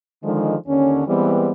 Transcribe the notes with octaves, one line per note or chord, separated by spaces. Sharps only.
D3 D#3 F3 G#3
D#2 D3 C#4
E3 G3 G#3 B3 C4